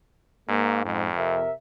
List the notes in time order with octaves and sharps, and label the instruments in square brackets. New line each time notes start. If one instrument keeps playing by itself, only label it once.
[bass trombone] G#2 [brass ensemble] A#3
[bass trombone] F2 [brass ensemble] G#2
[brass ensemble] C3 A#4 E5